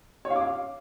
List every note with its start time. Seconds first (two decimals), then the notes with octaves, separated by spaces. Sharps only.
0.25 C#5
0.30 F5
0.36 D6
0.41 F5